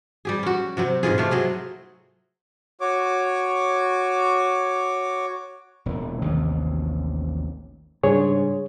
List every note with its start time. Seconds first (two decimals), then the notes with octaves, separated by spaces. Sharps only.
0.25 G3 G4 G#4
0.43 C#4 F#4
0.77 C3 F#3 C4
1.03 G#2 B2 F4 G#4
1.18 C3 A3 F5
1.31 F#3 A3 C4 G#4
2.81 F#4 C#5 D6
5.86 E1 A#2 E3
6.22 A1 D#2 C3 D#3
8.03 G#2 C#3 G3 D4 G#4 C#5